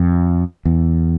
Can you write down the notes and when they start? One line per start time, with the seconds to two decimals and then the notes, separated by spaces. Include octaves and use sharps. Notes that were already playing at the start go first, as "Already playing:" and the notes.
Already playing: F2
0.65 E2